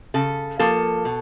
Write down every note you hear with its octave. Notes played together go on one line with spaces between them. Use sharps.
C#3 A4
F3 A#3 A4
B2